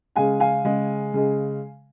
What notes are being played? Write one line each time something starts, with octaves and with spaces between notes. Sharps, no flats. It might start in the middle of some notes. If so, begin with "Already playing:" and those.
C#3 G#3 F5 G#5
F5 G#5
C#3 G#3
C#3 G#3